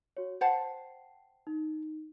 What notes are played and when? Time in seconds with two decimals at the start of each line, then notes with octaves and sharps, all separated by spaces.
0.17 F#4 C#5
0.41 C5 F#5 G5 A5 C7
1.47 D#4